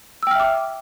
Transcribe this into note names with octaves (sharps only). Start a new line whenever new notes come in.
E5 G5 D6 E6 F6